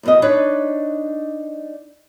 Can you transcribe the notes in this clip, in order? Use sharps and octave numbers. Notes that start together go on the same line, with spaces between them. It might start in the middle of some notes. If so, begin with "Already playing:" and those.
D#2 B2 D#5
D4 D#4 B4 C#5 D5